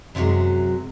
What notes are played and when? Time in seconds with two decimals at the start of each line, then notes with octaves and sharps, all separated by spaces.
0.15 F#2 C3 F3 F#3 G#3